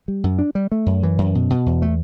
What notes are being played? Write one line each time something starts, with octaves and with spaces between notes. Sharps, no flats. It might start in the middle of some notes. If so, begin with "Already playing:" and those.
G3
F#2
D4
G3
A3
F#2
E3
F#2
B2
B2
E2
A3